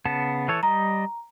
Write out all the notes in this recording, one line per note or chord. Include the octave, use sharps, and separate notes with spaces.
C#3 B3 A5
E3 A4 C#5
G3 D#5 A#5